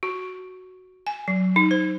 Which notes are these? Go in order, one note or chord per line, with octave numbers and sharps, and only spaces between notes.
F#4
G#5
F#3
D#4
C5